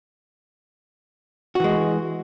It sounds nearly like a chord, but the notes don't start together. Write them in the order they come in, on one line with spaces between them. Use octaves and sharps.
F#4 E3 G#3